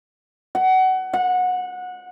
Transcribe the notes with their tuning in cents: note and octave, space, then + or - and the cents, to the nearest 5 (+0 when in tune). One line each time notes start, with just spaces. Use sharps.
F#5 +25
F#5 -20